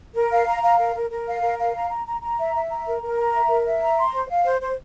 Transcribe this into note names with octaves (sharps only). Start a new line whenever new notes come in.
A#4
F5
A#5
F5
A#4
A#4
A#4
F5
A#4
F5
A#5
A#5
A#5
A#5
E5
E5
A#5
A#4
A#4
A#5
E5
A#4
E5
A#5
C6
C5
F5
C5
C5